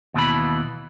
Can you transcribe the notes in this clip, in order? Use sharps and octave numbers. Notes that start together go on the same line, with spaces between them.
D#2 B2 E3 B5